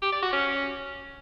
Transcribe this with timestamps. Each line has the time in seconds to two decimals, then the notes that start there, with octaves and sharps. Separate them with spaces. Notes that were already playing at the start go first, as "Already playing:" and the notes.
0.02 G4
0.12 D5
0.22 F#4
0.33 C#4